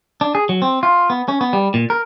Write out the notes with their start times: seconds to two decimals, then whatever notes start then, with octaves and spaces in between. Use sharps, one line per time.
0.21 D4
0.35 G#4
0.49 F#3
0.62 C4
0.83 F4
1.10 B3
1.28 C#4
1.41 B3
1.53 G3
1.74 A#2
1.90 A#4